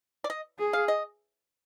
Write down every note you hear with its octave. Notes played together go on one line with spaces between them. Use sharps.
D5
D#5
G#4
F5
D#5